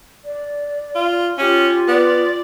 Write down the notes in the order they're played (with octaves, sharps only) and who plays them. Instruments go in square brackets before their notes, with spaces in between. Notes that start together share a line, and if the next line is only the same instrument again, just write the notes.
[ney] D5
[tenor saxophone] F4
[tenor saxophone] C#4 [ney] F4 [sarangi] G4
[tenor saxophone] B3 [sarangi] D5